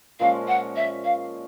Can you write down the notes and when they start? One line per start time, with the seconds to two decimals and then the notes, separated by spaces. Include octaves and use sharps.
0.20 A#2 F3 G#3 C#4 F5
0.48 F#5
0.76 E5
1.04 F5